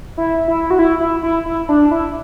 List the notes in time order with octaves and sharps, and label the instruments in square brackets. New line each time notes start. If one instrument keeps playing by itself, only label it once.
[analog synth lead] E4
E4
F#4
E4
E4
E4
E4
D4
E4